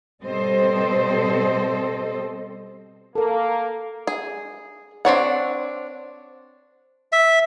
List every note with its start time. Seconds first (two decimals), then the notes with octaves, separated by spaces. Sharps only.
0.23 B2 G3 C4 A4 C5 D#5
3.15 A#3 A4 A#4
4.07 G#4
5.05 C4 D4 C#5 F#5
7.12 E5